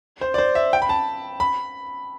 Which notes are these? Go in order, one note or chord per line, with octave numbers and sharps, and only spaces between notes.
C5
D5
C5
E5
G5
B5
A5
B5